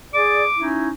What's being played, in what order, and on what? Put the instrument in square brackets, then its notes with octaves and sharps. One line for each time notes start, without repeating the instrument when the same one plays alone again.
[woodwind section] G#4 D5 [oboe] D6
[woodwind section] C#4 D#4 E4